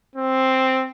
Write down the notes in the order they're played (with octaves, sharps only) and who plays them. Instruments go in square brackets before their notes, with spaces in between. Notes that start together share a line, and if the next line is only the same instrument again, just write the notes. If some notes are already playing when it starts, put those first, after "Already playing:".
[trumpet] C4